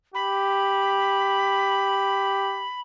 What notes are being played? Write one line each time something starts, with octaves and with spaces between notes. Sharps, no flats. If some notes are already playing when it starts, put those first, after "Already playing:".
G4 B5